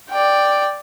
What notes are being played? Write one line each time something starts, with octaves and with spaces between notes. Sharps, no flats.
D5 G5